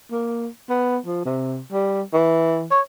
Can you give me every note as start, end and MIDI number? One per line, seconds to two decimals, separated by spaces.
0.12 0.48 58
0.69 0.98 59
1.06 1.21 53
1.25 1.61 48
1.72 2.02 55
2.13 2.65 52
2.71 2.80 73